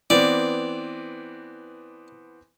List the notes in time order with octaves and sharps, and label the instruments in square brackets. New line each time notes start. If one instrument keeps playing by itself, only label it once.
[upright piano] E3 B3 C4 [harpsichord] D5